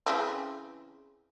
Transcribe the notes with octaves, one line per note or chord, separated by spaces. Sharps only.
C#3 E3 C4